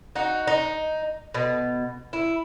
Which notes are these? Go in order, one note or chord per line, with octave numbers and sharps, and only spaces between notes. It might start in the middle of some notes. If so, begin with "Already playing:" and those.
D#4 F#4
D#4
B2
E4